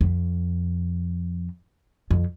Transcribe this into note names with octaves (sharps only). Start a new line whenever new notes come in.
F2
F2